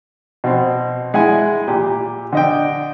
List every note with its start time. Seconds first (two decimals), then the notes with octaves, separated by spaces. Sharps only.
0.44 B2 C4
1.14 G#3 E4 F#5 G#5
1.68 A#2 G4
2.33 D3 D#5 G5